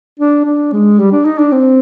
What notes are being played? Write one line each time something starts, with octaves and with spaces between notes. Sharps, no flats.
D4
D4
G#3
G3
D4
D#4
D4
C4